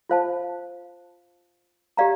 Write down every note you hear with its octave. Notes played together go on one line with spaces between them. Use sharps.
F4 C5 F5 A5
G4 D5 F5 A#5